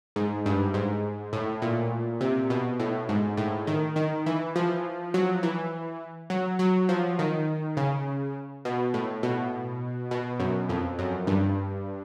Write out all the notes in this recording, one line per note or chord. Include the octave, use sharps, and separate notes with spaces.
G#2
G2
G#2
A2
A#2
C3
B2
A2
G#2
A2
D#3
D#3
E3
F3
F#3
E3
F#3
F#3
F3
D#3
C#3
B2
A2
B2
B2
F#2
F2
F#2
G2